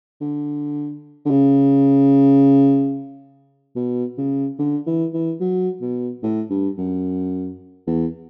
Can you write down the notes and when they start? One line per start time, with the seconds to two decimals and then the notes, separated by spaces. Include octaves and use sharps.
0.21 D3
1.25 D3
1.30 C#3
3.76 B2
4.17 C#3
4.59 D3
4.86 E3
5.13 E3
5.40 F#3
5.81 B2
6.23 A2
6.50 G2
6.78 F#2
7.87 E2